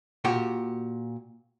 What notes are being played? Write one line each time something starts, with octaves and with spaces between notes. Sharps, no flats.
A#2 F#4 G4